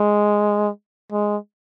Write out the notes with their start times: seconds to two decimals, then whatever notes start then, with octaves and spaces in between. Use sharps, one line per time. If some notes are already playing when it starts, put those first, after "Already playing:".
Already playing: G#3
1.12 G#3